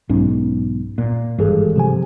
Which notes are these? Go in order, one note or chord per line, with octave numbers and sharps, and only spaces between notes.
B1 G#2 C#4
A#2
G#1 G2 E3 G#4 A4
C3 F3 G#5